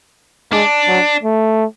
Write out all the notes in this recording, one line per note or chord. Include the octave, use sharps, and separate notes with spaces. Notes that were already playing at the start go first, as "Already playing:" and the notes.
G#3 D4
F#3
A3